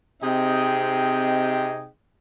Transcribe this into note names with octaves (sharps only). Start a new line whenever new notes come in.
C3 C4 D#4 G#4 D#5 G5